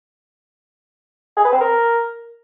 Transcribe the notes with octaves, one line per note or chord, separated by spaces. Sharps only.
G#4
B4
C4
A#4